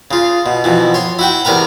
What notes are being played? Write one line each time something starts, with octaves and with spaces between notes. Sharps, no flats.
C#3 F4
B2
F2 B2 E3
C#5 C6
E4 F#4 G5
E2 C3 A#4 B4 A#5